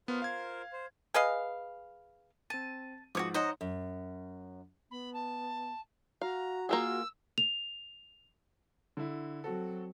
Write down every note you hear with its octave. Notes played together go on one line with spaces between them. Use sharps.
B3 F4 A#4 C5
F5 G#6
C5
G#4 B4 D#5 F5
C4 A5 D#7
G#2 F3 F#4 C#5 D6 D#6
D#4 C5 C#5 D#5 F#5 A#5
F#2
B3 B5
A5
F#4 F5 A#5
A#3 F4 G#4 E6
F7
D3 E4
F#3 C4 F#4 A4